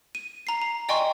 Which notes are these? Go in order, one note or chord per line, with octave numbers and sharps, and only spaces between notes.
D#7
A#5 C7
A#5
D5 D#5 G5 G#5 C6 C#6